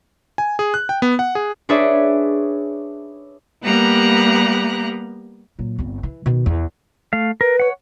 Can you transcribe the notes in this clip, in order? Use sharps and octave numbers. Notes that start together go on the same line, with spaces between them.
G#5
G#4
F#6
G5
B3
F#5
G#4
D4 G#4 B4 C#5 D5 E5
G3 A#3 B3 G4 A#5 F#6
A#2 F#3
G1 C4
E3
B2 D#3
E2
A3 F5
A#4 B4
C#5 F#5